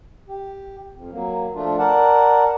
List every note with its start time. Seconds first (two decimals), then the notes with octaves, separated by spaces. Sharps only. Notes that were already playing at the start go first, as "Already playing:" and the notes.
0.29 G4
0.95 F2
1.12 F#3 A#3
1.55 F3 A3 D4 F4
1.79 A#4 D5 F#5 A5